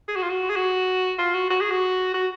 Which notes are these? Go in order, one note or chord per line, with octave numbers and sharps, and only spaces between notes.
G#4
F#4
F4
F#4
G#4
F#4
F4
F#4
F#4
G#4
F#4
F#4